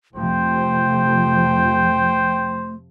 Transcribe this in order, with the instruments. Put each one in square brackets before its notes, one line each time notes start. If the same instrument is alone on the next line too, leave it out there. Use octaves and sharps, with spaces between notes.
[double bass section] F2 C3 F3 [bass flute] A3 [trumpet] C5 [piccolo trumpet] G5